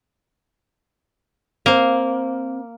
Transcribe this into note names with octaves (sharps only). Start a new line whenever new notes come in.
A#3 C4 C5